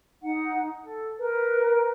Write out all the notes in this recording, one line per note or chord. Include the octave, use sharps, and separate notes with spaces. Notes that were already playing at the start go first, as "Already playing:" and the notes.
D#4 F#5
A4
A#4 B4